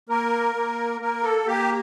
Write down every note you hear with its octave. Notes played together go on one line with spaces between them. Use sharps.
A#3 A#4
A#3
A#3 A#4
A4
A#3 G4